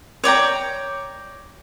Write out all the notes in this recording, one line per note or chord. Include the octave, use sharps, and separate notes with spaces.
C#5 D5 G5 A#5